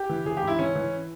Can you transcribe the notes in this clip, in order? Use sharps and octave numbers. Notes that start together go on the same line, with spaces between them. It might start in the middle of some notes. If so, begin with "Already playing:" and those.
Already playing: G4
E3
E3 G#4
G4
G#2
E4
E3 C#4
E3